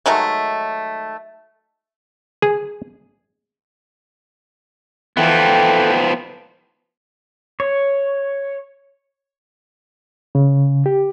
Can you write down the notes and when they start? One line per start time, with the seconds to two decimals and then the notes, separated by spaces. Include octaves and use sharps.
0.06 D#3 F#3 G#3 A3
2.42 G#4
5.17 E3 F3 A3 B3 G5
7.60 C#5
10.35 C#3
10.86 G4